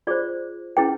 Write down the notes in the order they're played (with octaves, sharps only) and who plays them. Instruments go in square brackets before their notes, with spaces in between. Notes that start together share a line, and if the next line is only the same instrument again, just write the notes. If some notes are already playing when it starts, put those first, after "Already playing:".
[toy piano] F4 G#4 C5 D5
C#4 E4 G#4 B4 G5